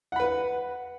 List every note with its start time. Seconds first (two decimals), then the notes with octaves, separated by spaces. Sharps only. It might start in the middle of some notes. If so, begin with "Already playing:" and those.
0.12 F#5
0.16 B5
0.20 B4